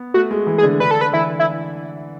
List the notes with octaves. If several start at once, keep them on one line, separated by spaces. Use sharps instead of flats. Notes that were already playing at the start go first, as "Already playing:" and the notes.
Already playing: B3
A3 F#4
G#3
E3
G#4
D3
D3 B4
A4
B4
E3 E4
E4